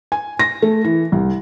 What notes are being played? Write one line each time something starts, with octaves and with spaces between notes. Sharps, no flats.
G#5
A#6
A3
E3
C2